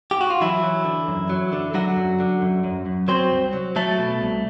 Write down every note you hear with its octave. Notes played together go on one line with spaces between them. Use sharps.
G4
F#4
F4
E3 F#3 E4
F#3
D3
F#2
F#3
D3
D3 F#3 F#4
F#2
D3
F#2
F#2
F#2
F#3 C4 C5
C2
F#3
F#3 A3 A4
B2
C2